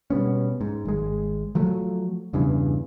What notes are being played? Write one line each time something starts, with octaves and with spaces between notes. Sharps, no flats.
B2 G3 B3 C#4
G#2
G#1 G#3
F3 F#3 A3
E2 G2 C#3 E3